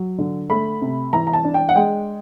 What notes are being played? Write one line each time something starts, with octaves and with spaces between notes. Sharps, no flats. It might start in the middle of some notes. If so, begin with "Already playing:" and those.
Already playing: F#3
D3
A3 B5
C3
E3 A#5
A#5
A5
D4
G5
F#5
G#3 G5